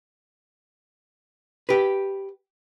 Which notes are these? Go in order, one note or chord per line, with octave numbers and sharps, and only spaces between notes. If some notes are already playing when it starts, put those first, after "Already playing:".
G4 B4